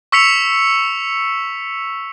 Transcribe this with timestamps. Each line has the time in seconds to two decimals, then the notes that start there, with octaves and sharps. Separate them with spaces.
0.12 C#6 E6 B6 C#7 F7